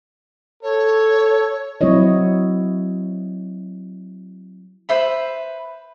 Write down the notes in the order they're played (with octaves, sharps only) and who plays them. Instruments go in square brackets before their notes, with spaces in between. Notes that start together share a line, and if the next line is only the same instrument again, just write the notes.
[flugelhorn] A4 [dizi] C#5
[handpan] F#3 C4 E4 C#5 D#5
[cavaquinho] B4 C5 E5 B5